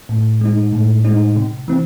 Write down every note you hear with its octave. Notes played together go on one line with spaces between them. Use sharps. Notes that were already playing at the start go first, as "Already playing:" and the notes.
A2
G#3 D#4
A2
G#3 D#4
C3
E3 C4